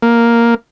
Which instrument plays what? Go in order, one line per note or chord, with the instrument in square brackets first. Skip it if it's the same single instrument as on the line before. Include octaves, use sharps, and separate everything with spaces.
[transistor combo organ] A#3